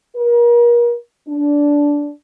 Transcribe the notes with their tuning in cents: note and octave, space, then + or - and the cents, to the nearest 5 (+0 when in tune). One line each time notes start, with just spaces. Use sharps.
A#4 +35
D4 -15